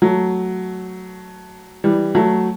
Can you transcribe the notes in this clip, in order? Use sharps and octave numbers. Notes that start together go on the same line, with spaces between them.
F#3 A3
E3 G3
F#3 A3